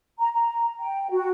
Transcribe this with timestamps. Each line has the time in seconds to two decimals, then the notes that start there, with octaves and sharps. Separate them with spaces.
0.19 A#5
0.33 A#5
0.78 G5
1.11 F#4